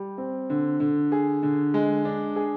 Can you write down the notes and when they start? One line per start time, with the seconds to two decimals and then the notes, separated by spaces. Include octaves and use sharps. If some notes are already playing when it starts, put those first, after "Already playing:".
Already playing: G3
0.18 C4
0.50 D3
0.80 D3
1.12 G#4
1.43 D3
1.74 G#3
2.05 D4
2.36 G#4